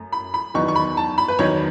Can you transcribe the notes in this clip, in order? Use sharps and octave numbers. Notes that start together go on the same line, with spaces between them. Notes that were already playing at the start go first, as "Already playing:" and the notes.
Already playing: F#2 A3
B5
B5
E2 D#3 F#3 B3 D#4 C#6
C#6
B5
A5
B5
B4
E2 D#3 F#3 B3 D#4 C#5